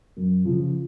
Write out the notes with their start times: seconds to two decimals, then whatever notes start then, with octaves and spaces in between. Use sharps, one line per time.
0.17 F#2
0.45 C#3 F3